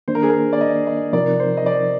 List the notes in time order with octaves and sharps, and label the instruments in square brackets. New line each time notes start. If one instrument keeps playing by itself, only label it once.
[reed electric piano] D#3 A#3 D4 [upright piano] C5
[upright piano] A#4
G#4
A#4
D5
D#5
D#5
[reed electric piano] C3 F3 C4 D#4 A#4 [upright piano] D5
[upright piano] C5
D#5
D5